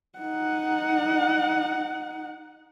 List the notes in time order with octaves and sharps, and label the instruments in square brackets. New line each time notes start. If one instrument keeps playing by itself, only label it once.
[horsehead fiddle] D#4 F#5